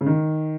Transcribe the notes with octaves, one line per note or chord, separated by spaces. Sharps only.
C#3
D#3